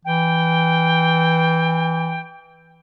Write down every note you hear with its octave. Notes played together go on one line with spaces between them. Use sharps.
E3 G5